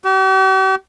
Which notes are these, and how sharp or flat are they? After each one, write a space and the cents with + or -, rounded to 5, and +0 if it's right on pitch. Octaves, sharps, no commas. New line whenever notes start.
G4 -45